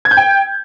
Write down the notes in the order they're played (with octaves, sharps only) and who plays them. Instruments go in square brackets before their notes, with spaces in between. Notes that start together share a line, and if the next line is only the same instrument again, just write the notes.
[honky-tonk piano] G#6
G6
G5